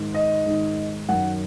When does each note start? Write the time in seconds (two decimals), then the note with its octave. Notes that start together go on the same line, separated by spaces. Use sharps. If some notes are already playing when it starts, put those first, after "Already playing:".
Already playing: G#2 D#3
0.14 D#5
0.46 G#2 D#3
1.09 F#2 D#3 F#5